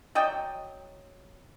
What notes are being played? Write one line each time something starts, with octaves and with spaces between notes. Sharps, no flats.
F#3 D5 D#5 G5